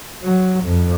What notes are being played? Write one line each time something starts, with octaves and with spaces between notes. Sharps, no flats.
F#3
F2